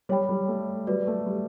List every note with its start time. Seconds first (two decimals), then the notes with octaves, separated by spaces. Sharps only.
0.09 G3 C#5 G5 B5
0.29 G3
0.48 A3
0.87 G3 F#4 B4 D5
1.07 A3
1.26 G3